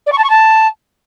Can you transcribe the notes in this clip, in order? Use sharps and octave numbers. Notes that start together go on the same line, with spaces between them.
D5
C#6
A5
C#6
A5